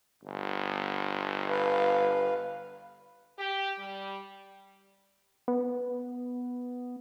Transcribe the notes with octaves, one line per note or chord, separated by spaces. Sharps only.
G1
B4 F5
G4
G3
B3